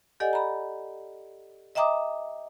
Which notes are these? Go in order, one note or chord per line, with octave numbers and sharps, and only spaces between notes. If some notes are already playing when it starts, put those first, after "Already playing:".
G4 A4 D5 D#5 F#5 G#5
A#5 B5
D#5 E5 G5 A#5 D6 D#6